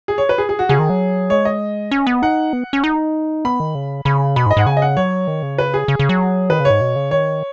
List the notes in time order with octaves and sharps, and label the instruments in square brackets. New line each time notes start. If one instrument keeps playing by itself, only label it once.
[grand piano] G#4
C#5
B4
G#4
G#4
F#4
[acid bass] C#3 [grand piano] G#4
[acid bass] D#3
F#3
[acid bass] G#3 [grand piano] C#5
[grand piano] D#5
[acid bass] C#4
B3
[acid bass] D#4 [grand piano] F#5
[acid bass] B3
C#4
D#4
[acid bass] B3 [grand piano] B5
[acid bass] D#3
C#3
[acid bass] C#3 [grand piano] B5
[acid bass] B2 [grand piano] B5
[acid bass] G#2
[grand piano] D#5
[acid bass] G#2 [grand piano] F#5
[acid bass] C#3 [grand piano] G#5
[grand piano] D#5
F#5
[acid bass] F#3 [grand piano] C#5
[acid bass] D#3
C#3
[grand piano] B4
G#4
[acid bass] C#3
C#3
F#3
[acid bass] D#3 [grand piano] B4
[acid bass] C#3 [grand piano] C#5
[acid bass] G#2
B2
C#3
[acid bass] D#3 [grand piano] C#5